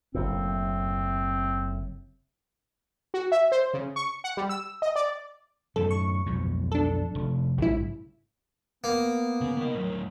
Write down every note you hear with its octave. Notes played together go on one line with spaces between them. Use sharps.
F#1 A2 C4
F#4
E5
C5
C#3
C#6
F#5
G3
E6
D#5
D5
F#2 A2 D#3 A4
C#6
B1 F2 G#2
D4 A4
F1
A#1 G#2 C#3 F#3 E4
A#3 B3
C#3
D#3 B3 D#5
A2 F#3